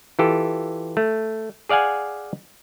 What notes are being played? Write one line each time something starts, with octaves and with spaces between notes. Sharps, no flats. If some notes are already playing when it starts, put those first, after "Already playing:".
E3 F4 G4 A4
A3
G#4 D5 F5 F#5 G#5